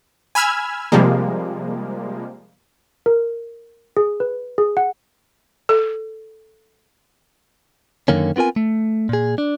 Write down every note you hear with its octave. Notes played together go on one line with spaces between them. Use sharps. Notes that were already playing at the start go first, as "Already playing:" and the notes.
G#5 B5 E6 F6 G#6
C3 F3 G3 G#3 A#3
A#4
G#4
B4
G#4
F#5
A4
F#2 D3 D#3 A#3 C#4
B3 C4 F4 A#4 G#5
A3
A#2 G#4
D4